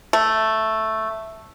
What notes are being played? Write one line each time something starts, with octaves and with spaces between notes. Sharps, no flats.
A3